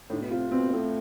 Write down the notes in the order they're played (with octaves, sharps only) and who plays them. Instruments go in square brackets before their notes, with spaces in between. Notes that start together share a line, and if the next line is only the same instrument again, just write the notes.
[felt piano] A2 [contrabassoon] D3
[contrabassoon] B2
[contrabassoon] C3 [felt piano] F4
[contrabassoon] B2 [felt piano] C4
[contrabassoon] B2
[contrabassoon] A2 [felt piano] C4